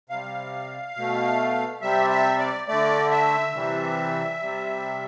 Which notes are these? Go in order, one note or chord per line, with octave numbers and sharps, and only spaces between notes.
C3 G3 F5
B2 A3
C3 G3 E5
E5
D5
D3 A3 D5
E5
C3 E3 G3
C3 G3